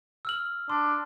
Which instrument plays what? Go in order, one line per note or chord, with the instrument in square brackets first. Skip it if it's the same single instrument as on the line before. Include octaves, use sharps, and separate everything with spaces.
[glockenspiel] E6 F6 F#7
[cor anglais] D4 [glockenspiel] C6